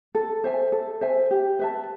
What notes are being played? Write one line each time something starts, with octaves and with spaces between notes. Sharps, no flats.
A4
C5 E5 G#5
A4
C5 E5 G#5
G4
B4 E5 A5